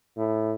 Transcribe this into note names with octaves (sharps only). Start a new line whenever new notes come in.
A2